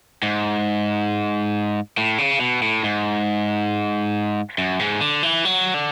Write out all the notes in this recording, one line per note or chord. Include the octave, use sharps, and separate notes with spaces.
G#2
A2
C#3
B2
A2
G#2
F#2
G#2
D3
E3
F#3
D3